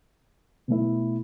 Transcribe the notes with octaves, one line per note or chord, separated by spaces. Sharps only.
B2 A3 E4